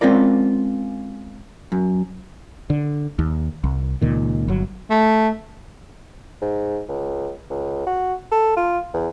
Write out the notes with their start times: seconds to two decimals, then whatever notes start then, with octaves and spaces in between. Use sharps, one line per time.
0.01 G#3 C4 C#4 F4 A#4 D5
1.72 F#2
2.70 D3
3.19 D#2
3.64 C2
4.01 C#2 A#2 D#3
4.48 G1 F#3
4.90 A3
6.41 G#2
6.88 C#2
7.50 C#2
7.86 F#4
8.32 A4
8.57 F4
8.94 E2